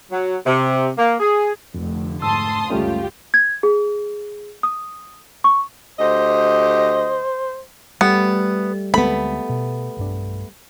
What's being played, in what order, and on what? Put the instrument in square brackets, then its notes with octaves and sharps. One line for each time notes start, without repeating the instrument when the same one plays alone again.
[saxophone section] F#3
C3
A#3
G#4
[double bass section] F1 D3 A3 [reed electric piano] F2
[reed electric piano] G#2 E6 [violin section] A5 C6 D#6
[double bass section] F#1 C#2 [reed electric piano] G3 A3 C#4 [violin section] F4 G4
[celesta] G#6
G#4
D#6
C#6
[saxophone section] D2 G4 D#5 [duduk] C5
[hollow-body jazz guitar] G3 [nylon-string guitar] A3 [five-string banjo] B3
[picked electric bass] D2 G#3 C4 [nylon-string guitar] A3 B3 [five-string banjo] B5
[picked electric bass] B2
B1 G2 D4